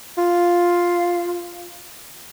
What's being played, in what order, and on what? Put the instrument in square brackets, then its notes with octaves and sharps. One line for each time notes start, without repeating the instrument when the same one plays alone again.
[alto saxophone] F4